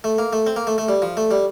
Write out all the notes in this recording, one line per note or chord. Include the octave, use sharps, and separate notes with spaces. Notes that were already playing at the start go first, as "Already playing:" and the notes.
A3
A#3
A3
C4
A#3
A3
A3
G3
F3
A3
G3